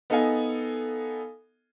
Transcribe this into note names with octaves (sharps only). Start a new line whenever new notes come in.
B3 D#4 A4 D#5 F5 G#5